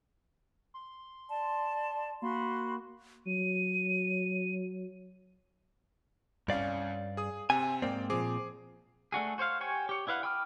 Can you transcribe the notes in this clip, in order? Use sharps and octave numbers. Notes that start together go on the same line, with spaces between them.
C6
D5 A5
A#3 F#4 B5 C6
F#3 D#7
C2 G2 C#4 D5 F5
G#4 D#6
C3 C4 G#5
G#2 A#3 C4 D5 G5
A#2 F3 C4 G#4 D6
A3 D4 F#4 G#4
F#4 C5 C#5 F5
F#4 G4 C#5 G#5
G4 C#5
D4 E4 B4 F5 F#5
G5 B5 D6 D#6 F6